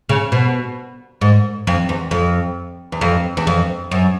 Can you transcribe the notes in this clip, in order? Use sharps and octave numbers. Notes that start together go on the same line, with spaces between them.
C#3
B2
G#2
F2
E2
F2
E2
F2
E2
F2
F#2